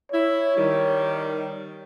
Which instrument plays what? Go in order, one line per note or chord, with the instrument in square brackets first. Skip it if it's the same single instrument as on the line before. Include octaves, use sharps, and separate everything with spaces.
[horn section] E4 [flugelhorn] C#5
[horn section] D#3 G3